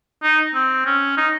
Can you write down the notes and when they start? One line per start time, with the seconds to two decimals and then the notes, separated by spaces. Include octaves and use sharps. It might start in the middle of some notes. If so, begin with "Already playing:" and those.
0.23 D#4
0.55 C4
0.86 C#4
1.17 D#4